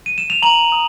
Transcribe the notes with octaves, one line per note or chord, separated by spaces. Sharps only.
D#7
E7
F7
A#5 F#7
D#6